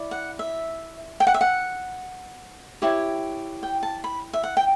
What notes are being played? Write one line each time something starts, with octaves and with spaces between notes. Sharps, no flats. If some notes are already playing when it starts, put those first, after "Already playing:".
Already playing: E4 D5
F#5
E5
G5
F#5
E5
F#5
E4 G4 C#5
G5
A5
B5
E5
F#5
G5